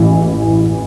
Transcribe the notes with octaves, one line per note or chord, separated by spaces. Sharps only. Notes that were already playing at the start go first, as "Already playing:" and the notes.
Already playing: A1 E3